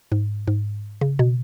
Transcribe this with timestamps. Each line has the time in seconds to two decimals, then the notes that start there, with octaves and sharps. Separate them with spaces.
0.12 G#2
0.47 G#2
1.01 C#3
1.19 B2